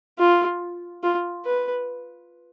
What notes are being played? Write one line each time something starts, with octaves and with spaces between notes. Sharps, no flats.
F4
F4
B4